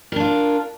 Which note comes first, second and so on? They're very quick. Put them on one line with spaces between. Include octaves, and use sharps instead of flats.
A#4 D4 F4